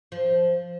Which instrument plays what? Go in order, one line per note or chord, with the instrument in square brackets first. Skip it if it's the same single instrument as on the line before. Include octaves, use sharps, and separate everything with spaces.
[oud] F3